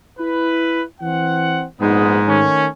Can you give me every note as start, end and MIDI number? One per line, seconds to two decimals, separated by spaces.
0.19 0.83 64
0.19 0.83 71
1.01 1.65 52
1.01 1.65 60
1.01 1.65 78
1.81 2.21 34
1.81 2.43 44
1.81 2.21 56
1.81 2.21 59
2.27 2.67 51
2.27 2.67 57
2.27 2.67 61